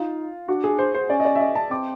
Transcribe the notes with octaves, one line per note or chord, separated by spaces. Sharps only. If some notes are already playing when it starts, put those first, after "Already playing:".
Already playing: D#4 F4
D4 F#4
G#4
C5
C5
C#4 D5
D#5
D5
E5
D#5
A5
C4 D6